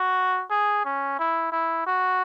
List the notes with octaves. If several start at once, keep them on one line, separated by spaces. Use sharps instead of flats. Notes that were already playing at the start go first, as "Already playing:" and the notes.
Already playing: F#4
G#4
C#4
E4
E4
F#4